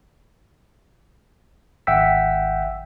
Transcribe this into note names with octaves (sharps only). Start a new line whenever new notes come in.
G#1 E5 F#5 G5 E6 B6